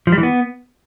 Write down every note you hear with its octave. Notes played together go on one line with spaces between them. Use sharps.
F3
G3
E3
B3